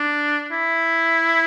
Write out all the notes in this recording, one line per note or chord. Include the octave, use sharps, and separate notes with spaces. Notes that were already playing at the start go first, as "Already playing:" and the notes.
Already playing: D4
E4